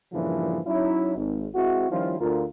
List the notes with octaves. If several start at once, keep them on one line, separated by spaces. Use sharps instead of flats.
G2 A#2 C#3 E3 F3
F#3 C#4 D#4 E4
G#1
G#3 C4 E4 F#4
D#3 F3 G3 C#4 E4 F4
D2 F4 A#4